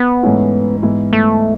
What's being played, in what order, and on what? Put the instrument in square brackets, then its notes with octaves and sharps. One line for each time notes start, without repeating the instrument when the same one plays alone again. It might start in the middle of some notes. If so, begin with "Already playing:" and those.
Already playing: [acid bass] B3
[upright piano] G#2 E3 A3 C#4 E4
G#2 E3 B3 E4
[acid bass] A3